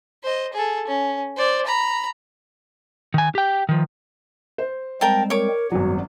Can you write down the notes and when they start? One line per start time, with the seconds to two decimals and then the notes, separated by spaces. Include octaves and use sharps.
0.23 C5 D#5
0.53 G#4 A4
0.87 C#4
1.36 C5 D5
1.66 A#5 B5
3.14 D#3 G#5
3.35 G4 G5
3.69 D#3 F3
4.58 C5
5.01 G3 G#3 C4 A#4 G5 A5
5.30 A#4 C#5 D6
5.72 G#1 F#2 F#3 G3 B3 F#4